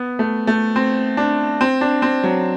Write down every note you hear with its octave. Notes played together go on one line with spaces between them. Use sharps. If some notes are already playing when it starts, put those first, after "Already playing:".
Already playing: B3
A3
A3
C4
D4
C4
D4
C4
F#3